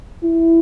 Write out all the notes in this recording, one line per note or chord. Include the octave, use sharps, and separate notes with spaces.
E4